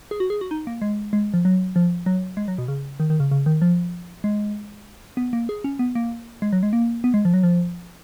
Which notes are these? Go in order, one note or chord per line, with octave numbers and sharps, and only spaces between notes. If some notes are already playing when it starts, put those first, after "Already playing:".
G#4
F#4
G#4
F#4
D#4
A#3
G#3
G#3
F3
F#3
F3
F#3
G#3
F#3
B2
C#3
D#3
D#3
C#3
C#3
D#3
F3
G#3
B3
A#3
G#4
C#4
B3
A#3
G#3
F#3
G#3
A#3
B3
G#3
F3
F#3
F3